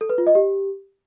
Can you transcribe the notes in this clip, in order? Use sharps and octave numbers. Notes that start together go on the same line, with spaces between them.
A4
B4
F4
D#5
G4